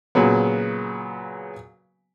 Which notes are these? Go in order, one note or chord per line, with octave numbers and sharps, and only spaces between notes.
A#2 C#3 F#3 B3